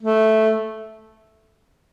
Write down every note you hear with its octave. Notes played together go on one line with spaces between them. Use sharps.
A3